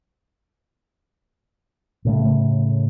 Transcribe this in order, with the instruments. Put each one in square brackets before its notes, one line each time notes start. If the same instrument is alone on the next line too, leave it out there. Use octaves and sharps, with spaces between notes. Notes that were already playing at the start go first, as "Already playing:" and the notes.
[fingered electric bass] A2 C#3 A3